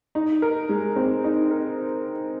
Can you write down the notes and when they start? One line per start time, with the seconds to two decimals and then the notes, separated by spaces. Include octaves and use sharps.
0.15 D#4
0.42 A#4
0.69 G#3
0.96 C4
1.24 D#4
1.51 A#4